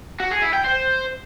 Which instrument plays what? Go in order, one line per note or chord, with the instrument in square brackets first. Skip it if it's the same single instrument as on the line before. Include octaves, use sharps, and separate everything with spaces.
[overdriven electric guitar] F#4
G#4
E4
G5
C5